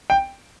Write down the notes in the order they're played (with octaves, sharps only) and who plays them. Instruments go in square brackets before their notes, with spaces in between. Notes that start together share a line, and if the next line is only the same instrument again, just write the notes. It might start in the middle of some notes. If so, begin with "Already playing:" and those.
[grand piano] G5